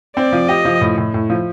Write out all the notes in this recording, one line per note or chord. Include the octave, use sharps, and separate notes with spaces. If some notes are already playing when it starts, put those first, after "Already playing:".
C4 D5
F3
G4 D#5
F3
A2
A2
A2
F3